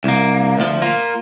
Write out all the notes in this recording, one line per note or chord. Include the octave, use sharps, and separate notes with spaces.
C2 A#3
D2 F3
A#3 F4